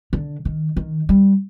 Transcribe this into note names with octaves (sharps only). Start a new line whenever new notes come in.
D3
D#3
D#3
G3